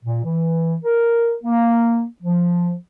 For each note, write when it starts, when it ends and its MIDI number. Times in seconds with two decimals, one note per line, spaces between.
0.04 0.20 46
0.24 0.75 52
0.84 1.34 70
1.44 2.04 58
2.23 2.74 53